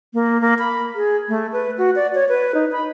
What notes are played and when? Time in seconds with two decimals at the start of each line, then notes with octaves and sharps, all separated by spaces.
0.14 A#3
0.41 A#3
0.59 B5
0.95 G#4
1.29 A3
1.52 B4
1.78 F#4
1.96 D5
2.15 C#5
2.29 B4
2.55 D#4
2.72 B5